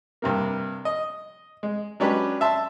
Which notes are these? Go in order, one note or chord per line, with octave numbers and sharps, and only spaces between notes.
G2 C3 A#3
D#5
G#3
F#3 G#3 C#4 D4 G4 B4
E5 A5 C6